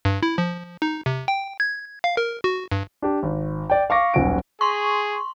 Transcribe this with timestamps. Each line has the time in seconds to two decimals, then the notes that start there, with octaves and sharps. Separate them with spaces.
0.05 G2
0.23 E4
0.38 F3
0.82 D#4
1.06 C3
1.28 G5
1.60 G#6
2.04 F5
2.17 A#4
2.44 F#4
2.72 G2
3.02 D4 G4
3.23 G#1
3.70 D5 G5
3.90 F5 C#6 D6 A#6
4.14 D#1 B1 C#4 F#5 D7
4.61 G#4 C6 C#6